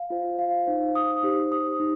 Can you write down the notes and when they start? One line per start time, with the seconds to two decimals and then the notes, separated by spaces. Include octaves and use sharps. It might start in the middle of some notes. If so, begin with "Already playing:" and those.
Already playing: F5
0.10 F4 C5
0.39 F5
0.67 D#4 C5
0.95 D#6
1.23 D#4 G4 C5
1.52 D#6
1.80 D#4